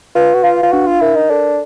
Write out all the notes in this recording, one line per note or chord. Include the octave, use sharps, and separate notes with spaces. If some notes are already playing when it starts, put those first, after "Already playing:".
F4 B4
F#4
F4 F5
F4
D4 F#4
F4
E4 A#4
D#4
D4 A4